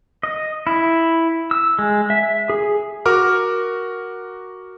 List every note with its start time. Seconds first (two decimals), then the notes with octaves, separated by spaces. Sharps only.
0.23 D#5
0.67 E4
1.51 E6
1.79 G#3
2.10 E5
2.50 G#4
3.06 F#4 A#4 D6 F6